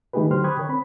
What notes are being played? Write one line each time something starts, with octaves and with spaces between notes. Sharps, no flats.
D#3 A3 D#4 G4 G#4 B4
D3 F#3 G4 C5 C6 F6
G5 B5 C#6 D#6 F#6 G#6
D3 A#4 C#5
C4 B5